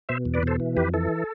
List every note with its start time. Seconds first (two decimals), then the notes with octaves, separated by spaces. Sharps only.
0.09 B2 C5 E5
0.25 E2
0.34 B4 D5
0.43 B2 A4 C5
0.60 E3
0.77 F2 G4 B4
0.94 E3 A4